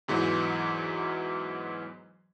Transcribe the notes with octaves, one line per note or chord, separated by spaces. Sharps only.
E2 G#2 E3 F#3